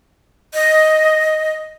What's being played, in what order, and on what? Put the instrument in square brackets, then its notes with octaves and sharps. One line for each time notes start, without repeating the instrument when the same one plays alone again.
[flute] D#5